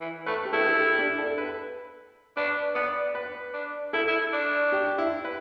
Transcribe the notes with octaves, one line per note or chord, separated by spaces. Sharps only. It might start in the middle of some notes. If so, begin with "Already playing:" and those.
E3
A3 B4
G4
E4 A4
A4
G4
D4
A4
B4
D4 B4
B3 D5
B4
D4
E4 A4
E4
D4
G4
E4
B4